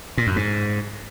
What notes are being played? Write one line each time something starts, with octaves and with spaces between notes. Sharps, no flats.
A#2
F#2
G#2